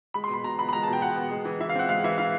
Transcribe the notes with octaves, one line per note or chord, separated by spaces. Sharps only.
G#3 B5
C6
B2 B5
B2 A#5
B3 B5
B5
G#3 A#5
A5
B2
G5
B2 F#5
B3
G#3
E3
E3 E5
F5
C4 F#5
G#3 F5
E3 E5
E3 F5